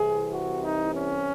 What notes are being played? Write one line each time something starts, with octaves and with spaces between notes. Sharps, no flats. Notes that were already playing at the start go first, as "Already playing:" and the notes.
Already playing: C2 C3 E3 G#4
F#4
D#4
C#4